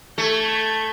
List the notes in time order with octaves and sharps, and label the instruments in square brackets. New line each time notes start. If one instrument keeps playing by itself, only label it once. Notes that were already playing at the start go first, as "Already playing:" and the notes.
[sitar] A3 [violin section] A4 G6 G#6